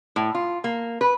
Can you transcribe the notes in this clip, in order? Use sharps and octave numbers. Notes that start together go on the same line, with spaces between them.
A2
F4
A#3
B4